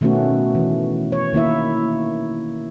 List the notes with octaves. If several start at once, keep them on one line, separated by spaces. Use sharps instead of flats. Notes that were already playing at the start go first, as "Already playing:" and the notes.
B2 D#3 A3 B3 C#4 F#4
E3
C#5
D#3 A#3 E4 E5